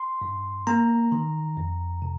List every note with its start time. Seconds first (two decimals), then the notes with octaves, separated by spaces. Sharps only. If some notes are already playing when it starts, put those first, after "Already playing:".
Already playing: C6
0.22 G2
0.67 A#3 A#5
1.12 D#3
1.57 F2
2.02 C3